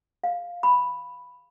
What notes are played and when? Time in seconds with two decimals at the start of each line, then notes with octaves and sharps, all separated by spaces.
0.24 F5
0.63 B5